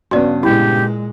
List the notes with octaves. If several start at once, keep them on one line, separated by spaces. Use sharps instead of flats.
G2 C#3 B3 F#4 D5
A#2 G#3 E4 G4